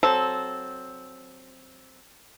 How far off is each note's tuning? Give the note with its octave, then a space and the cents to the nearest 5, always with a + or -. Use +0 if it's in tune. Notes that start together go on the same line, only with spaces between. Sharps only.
F#3 +0 C4 +5 A4 -20